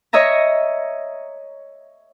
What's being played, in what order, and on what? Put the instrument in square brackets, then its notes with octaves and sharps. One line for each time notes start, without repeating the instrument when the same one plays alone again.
[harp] C#5 D#5 E5 A#5